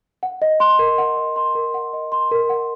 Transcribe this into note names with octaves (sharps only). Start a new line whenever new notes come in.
F#5
D#5
C6
A#4
F#5
D#5
C6
A#4
F#5
D#5
C6
A#4
F#5